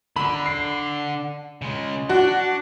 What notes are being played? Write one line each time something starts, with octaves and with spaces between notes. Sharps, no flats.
D3 B5
C7
C#3 G#3
D4 F#4 F#5